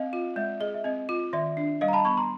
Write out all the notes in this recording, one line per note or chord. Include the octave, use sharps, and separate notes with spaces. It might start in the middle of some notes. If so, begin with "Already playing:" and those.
Already playing: C4 D#5 F5
F4
G#3 D5 E5
G#4 D#5
E5
C4 D#5
F4
D#3 D5 E5
D4
G3 D#5 F5
A#5
A5 B5
B3 B5 C#6
A#5 C6